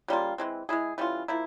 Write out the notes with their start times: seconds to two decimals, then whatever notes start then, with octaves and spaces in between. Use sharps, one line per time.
0.08 C#3 G3 A#3 F4
0.38 E3 G#3 C4
0.69 G#3 E4 G#4
0.98 E3 G3 C#4 F4
1.28 F3 A#3 E4